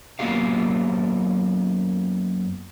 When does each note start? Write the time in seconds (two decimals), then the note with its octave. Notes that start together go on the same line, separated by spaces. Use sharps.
0.19 F#2 A#3 B3 F#4 G4 F5